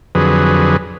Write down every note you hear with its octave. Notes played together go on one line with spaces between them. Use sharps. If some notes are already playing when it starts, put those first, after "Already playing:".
F2 D3 F#3 G#4 B4